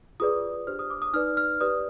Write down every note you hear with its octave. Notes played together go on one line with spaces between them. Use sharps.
F4 G#4 B4 D5 D#6
D4 G4 C5 F6
D#6
D6
D#6
D#4 B4 D5 F6
F6
G4 B4 D5 D#6